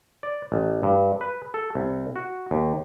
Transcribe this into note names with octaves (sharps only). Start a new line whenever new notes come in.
D5
A1
G2
B4
A4
C2
F#4
D#2